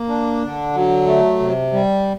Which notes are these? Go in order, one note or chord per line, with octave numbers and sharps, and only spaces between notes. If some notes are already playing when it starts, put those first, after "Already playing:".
Already playing: A#3
D4
D3
F#3
A3
C3
G3